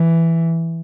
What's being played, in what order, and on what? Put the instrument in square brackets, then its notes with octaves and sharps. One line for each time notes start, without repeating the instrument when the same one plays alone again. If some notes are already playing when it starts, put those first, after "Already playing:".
Already playing: [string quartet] E3